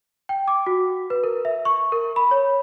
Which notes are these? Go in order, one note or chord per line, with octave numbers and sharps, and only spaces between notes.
G5
D6
F#4
B4
A#4
E5
C#6
A#4
B5
C#5